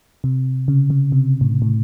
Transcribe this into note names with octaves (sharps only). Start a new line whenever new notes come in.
C3
C#3
C#3
C3
A2
A2